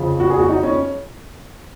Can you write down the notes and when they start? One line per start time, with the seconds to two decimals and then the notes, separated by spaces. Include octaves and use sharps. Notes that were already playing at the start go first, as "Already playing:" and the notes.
Already playing: F2 C#3 F3
0.20 F#4
0.30 G#4
0.39 F#4
0.49 D#4
0.63 C#4